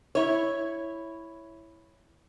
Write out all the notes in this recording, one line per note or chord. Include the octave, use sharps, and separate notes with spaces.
E4 C#5